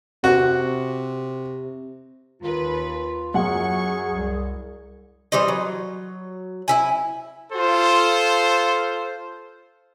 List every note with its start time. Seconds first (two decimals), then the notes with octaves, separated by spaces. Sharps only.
0.24 C3 F#4
2.42 D#2 F4 B4
3.34 F#2 G#4 F#5 C#6
4.11 C2
5.32 E3 G3 C5 D#5
5.48 F#3
6.68 E4 E5 G#5
7.52 F4 A4 C5